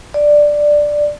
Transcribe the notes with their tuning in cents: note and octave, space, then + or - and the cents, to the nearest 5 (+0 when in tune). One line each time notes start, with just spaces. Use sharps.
D5 +5